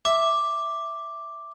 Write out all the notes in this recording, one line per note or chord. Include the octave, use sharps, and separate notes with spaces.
E5 D6